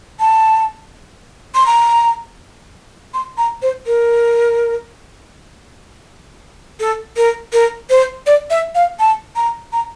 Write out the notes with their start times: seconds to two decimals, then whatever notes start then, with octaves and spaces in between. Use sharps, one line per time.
0.20 A5
1.55 C6
1.66 A#5
3.14 C6
3.38 A#5
3.62 C5
3.86 A#4
6.80 A4
7.17 A#4
7.53 A#4
7.90 C5
8.26 D5
8.50 E5
8.75 F5
8.99 A5
9.36 A#5
9.72 A#5